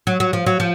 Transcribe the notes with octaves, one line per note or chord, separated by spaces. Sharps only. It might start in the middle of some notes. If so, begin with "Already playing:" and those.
F#3
F#3
F3
F#3
F3